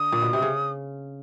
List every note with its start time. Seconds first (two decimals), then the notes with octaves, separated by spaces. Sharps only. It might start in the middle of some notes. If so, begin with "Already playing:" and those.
Already playing: D3 D#6
0.12 A#2
0.22 B2
0.33 C3
0.42 C#3